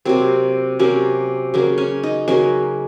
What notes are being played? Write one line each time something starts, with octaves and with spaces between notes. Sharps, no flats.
C3 F#3 A#3 C4
C3 F#3 A#3 C#4
C#3 F#3 A#3
C#4
D#4
C#3 F#3 A#3 C#4